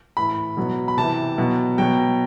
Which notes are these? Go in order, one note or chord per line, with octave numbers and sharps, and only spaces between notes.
A2 E3 B5
B2 F#3
B5
C3 E3 A5
B2 F#3
B2 F#3 G5